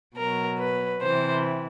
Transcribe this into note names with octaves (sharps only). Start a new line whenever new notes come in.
B2 F#3 A#4
B4
C3 E3 C5